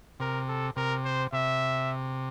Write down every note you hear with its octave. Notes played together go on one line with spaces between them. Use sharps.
C3 A#4
A4
C3 A#4
C5
C3 E5